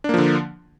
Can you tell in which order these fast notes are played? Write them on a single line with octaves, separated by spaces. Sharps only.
D4 A#3 F3 D3